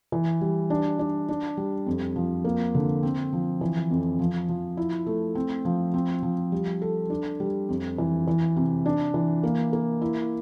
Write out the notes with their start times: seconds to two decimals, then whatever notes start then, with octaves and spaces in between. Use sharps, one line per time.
0.12 E3
0.41 G3
0.70 D4
0.99 D4
1.29 D4
1.57 G3
1.86 F2
2.16 F3
2.45 A#3
2.75 D3
3.03 C4
3.33 F3
3.61 E3
3.91 F2
4.19 F3
4.49 F3
4.77 E4
5.07 A3
5.35 C4
5.65 F3
5.94 C4
6.23 F3
6.52 G3
6.82 A4
7.10 D4
7.40 G3
7.69 F2
7.98 E3
8.27 E3
8.56 C3
8.86 D4
9.14 E3
9.43 A#3
9.73 A#3
10.02 E4